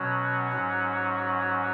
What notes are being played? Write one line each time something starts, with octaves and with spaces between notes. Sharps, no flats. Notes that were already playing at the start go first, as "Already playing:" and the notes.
Already playing: B2 F#3 C#4 F#4
G#2 F#3 C#4